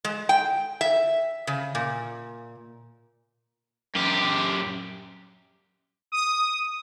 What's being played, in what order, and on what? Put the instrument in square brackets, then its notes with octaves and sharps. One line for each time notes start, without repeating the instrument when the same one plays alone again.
[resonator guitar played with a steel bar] G#3
G5
E5
C#3
A#2
[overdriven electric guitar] F#2 G4
[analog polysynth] D#6